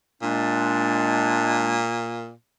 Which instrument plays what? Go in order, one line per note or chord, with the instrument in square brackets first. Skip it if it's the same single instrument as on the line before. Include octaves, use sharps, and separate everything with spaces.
[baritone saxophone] A#2 [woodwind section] G#3 D4